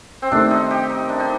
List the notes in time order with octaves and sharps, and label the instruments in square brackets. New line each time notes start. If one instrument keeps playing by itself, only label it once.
[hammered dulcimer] C4
[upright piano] C3 D#3 A3 [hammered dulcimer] D4
[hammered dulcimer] D#4
G4
D#4
D4
D#4